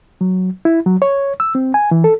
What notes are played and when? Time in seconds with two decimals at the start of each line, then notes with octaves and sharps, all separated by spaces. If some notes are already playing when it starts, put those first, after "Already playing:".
0.21 F#3
0.65 E4
0.86 F#3
1.02 C#5
1.40 E6
1.55 C4
1.74 G#5
1.91 E3
2.04 A4